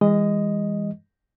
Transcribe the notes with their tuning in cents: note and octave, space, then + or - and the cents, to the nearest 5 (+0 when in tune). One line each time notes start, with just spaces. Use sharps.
E3 +0 G#3 -30 D#5 +0